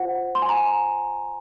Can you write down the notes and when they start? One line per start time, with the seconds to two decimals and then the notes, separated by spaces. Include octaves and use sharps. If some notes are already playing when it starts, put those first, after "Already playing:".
Already playing: F4 C5 F#5
0.35 C6
0.42 G#5
0.49 A#5